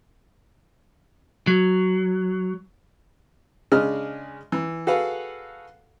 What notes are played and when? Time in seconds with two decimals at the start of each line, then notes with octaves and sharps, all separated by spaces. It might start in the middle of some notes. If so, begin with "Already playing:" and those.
1.47 F#3
3.72 C#3 G#3 D4 D#5 F6
4.52 E3
4.87 F#4 G#4 A4 B4 F5 F#5